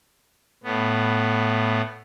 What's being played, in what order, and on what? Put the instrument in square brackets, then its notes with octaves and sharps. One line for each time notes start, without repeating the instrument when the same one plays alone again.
[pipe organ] A2 B3